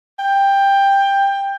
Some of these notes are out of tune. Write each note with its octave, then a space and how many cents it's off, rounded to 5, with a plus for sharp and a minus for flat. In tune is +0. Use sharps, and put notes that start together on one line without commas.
G5 +15